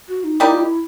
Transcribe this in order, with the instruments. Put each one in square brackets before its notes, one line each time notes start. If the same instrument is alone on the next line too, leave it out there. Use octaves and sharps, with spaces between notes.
[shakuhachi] F#4
D#4
[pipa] G3 A#3 D#4 G4 [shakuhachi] E4
[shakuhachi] F4
E4